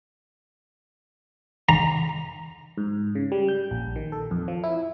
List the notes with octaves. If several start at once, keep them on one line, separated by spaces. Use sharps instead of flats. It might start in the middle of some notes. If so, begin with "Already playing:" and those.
A#5
G#2
C#3
G3
G6
A#1
D#3
A4
F2
F3
E4